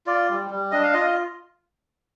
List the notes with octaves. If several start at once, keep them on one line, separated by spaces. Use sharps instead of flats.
F4 D5
G3
G3
D4 D#5
F5
F4 D#5